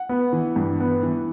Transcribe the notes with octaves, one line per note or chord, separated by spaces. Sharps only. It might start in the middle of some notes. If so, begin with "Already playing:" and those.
Already playing: F#5
B3
E3
G2
B3
E3